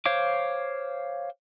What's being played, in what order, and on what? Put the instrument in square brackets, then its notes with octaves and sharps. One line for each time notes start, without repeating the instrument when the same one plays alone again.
[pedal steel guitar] C5 C#5 F5 D6